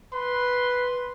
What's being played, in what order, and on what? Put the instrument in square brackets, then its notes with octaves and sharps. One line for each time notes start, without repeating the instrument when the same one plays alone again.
[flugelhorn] B4 [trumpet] C6